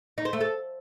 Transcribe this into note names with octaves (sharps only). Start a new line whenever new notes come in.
D#4
C5
A3
A4